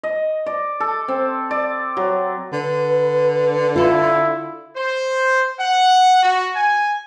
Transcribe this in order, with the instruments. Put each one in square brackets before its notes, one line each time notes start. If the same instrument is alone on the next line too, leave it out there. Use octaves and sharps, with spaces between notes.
[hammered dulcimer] D#5
D5
A4
C4
D5
F#3
[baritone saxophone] D3 [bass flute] B4
[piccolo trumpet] E4 [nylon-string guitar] F4 A4
[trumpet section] C5
F#5
F#4
G#5